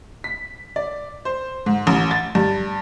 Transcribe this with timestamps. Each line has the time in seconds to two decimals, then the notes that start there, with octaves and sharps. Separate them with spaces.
0.24 B6
0.76 D5
1.25 C5
1.66 G#2
1.87 A1
2.11 A6
2.35 G2